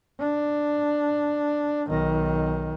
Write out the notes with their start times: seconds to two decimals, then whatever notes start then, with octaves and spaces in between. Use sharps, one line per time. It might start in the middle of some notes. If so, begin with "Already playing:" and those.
0.20 D4
1.87 B1 D#3